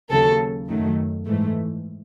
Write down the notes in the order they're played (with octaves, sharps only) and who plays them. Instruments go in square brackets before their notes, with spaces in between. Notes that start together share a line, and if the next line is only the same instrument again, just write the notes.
[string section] D#2 C#3 F#3 A4
F#2 D#3 F#3 A3
G#2 E3 A3